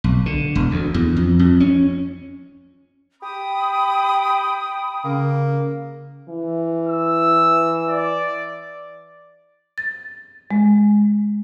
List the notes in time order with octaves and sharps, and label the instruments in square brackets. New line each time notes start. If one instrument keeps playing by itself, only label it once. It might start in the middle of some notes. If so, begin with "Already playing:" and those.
[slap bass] B1
D3
E1
D2
E2
F2
F2
C#4
[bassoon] G4 [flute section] G5 B5 D#6
[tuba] C#3 [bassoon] A#3
[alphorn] E3
[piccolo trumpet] E6
D5
[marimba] A6
G#3